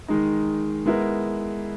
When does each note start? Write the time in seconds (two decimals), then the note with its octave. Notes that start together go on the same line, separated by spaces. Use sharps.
0.08 D#3 G#3 D#4
0.86 G#3 B3 E4 A#4